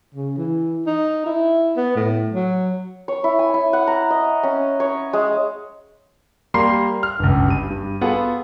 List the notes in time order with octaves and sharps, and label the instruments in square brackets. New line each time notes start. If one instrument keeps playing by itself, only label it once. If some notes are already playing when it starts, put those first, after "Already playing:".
[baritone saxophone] C#3
E3
D#4
E4
B3
A2
F#3
[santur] C#5
E4
G#5
E4
F#5
A#5
D#5
C#4
C#5
G#3
[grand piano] G3 A#3 A#5 C6 C7
F6
G1 C#2
G2 D#7
G2
B3 F4 F#4 G#4 A4 F#5